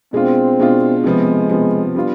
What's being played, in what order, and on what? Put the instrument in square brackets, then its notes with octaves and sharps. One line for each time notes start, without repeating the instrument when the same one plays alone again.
[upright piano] B2 G#3 D4 F4 [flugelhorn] C4
[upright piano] B2 G#3 D4 F4
[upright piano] C3 F3 B3 [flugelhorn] G#3
[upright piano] C3 F3 B3
G3 B3 D4 F4